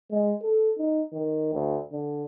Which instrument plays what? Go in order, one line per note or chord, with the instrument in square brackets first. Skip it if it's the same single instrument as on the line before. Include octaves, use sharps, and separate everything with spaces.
[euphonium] G#3
A4
D#4
D#3
D2
D3